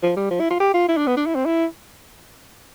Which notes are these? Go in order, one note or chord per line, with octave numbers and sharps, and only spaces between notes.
F3
G3
F3
E4
F4
G4
F4
E4
D4
B3
D4
E4
C4
E4